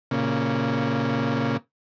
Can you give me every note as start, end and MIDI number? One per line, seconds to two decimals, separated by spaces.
0.11 1.57 46
0.11 1.57 49